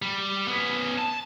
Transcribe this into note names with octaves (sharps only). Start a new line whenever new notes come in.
G3
B3 C#4
A5